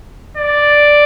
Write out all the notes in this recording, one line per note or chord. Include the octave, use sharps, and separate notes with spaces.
D5